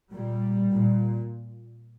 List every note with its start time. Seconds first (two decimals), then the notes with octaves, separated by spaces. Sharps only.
0.13 A#2 G3
0.72 A#2